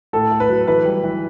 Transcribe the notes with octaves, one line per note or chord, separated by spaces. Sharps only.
A2 A4
A3
B4
F#3
E3 B4
G3
E3